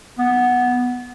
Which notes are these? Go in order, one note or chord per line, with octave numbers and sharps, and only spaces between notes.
B3